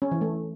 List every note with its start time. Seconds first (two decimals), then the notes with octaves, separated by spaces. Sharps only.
0.02 C#4
0.12 E3
0.21 A3